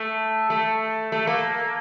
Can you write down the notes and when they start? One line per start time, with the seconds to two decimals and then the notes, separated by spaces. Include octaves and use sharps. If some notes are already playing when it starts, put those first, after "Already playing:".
Already playing: A3
0.50 A3
1.12 A3
1.27 A#3